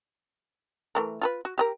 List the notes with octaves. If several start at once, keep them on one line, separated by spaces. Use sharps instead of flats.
E3 A3 A#4
F4 A4 B4
F#4
G4 G#4 A#4